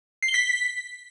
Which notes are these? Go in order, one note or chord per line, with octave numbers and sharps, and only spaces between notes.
C7
G7
B6